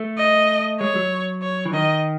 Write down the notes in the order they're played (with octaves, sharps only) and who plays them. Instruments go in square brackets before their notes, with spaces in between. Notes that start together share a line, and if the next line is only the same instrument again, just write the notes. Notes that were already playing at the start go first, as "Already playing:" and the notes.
Already playing: [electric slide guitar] A3
[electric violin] D#5
[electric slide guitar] G#3 [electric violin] C#5
[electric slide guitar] F#3
[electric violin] C#5
[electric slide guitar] E3
[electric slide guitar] D#3 [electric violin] D#5